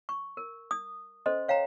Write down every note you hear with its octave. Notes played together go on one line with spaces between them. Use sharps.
C#6
A#4
D#6
C#4 A4 C5 D#5 C6
C#5 F5 G5 A#5